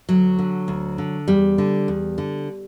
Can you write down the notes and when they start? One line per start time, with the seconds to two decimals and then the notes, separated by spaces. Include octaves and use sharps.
0.09 D2 F#3
0.39 D3
0.68 D2
0.98 D3
1.28 E2 G3
1.58 D3
1.88 E2
2.18 D3